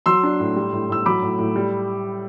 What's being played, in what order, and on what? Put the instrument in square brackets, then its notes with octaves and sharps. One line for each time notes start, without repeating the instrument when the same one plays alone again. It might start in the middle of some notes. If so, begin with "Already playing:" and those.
[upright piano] F#3 C6 E6
D4
A2
G3
A2
A2 E6
F#3 B5 D6
A2
A2
G3